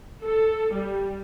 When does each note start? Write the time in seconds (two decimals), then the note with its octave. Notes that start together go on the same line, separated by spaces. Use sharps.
0.24 A4
0.74 G3